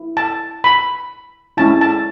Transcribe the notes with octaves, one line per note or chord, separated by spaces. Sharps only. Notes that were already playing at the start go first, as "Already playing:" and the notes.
Already playing: E4
A5
B5
G#3 C#4 E4 A5
A5